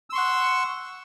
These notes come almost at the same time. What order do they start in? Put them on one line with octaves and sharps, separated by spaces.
E6 C6 C#6 F#5